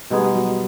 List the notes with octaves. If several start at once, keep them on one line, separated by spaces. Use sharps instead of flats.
B2 G3 G#3 B3 D#4 G#4
F#3